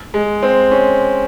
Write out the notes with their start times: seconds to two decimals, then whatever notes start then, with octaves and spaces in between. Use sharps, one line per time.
0.14 G#3
0.43 C4
0.71 C#4